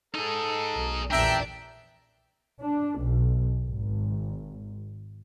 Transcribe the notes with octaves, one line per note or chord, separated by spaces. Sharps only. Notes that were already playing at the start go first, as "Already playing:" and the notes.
D#4 G#4 A4
B1
A#1 E2 A#2 D4 E5 G5 A#5
D4
B1
G#1